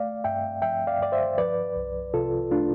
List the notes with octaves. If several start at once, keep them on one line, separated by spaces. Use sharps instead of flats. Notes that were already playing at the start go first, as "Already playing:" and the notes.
Already playing: A3 D5 F5
G2 E5 G5
F3 E5 G5
D5 F5
G2 D5
C5 E5
F3 B4 D5
C2
C3 F4 A4
A3 D4 F4